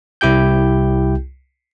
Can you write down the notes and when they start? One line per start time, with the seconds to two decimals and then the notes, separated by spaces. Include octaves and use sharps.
0.21 C2 E4 G4 G5 G6